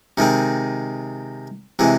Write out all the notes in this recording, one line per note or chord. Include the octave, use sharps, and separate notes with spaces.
C3 D#3 G#3 C4
C3 E3 G#3